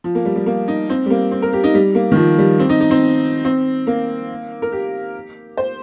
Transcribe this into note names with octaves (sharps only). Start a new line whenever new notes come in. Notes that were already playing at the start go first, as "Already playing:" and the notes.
F3
A#3
G3
G3
A#3
D#4
C4
G3
A#3
C4
A#4
G4
D#4
G3
A#3
D#3
F3
G3
C4
D#4
D#4
C4
C4
A#3
A#4
G4
C5